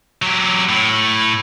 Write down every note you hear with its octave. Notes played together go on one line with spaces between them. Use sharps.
F#3 G4
A2